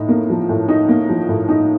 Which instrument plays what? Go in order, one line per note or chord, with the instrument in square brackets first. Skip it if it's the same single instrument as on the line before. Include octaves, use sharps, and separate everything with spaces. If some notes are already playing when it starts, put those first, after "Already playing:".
Already playing: [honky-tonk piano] A2 D#4
A#3
F3
A2
D#4
A#3
F3
A2
D#4